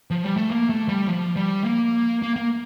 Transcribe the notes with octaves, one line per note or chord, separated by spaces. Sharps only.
F3
G3
A3
A#3
A3
G3
F3
G3
A#3
A#3
A#3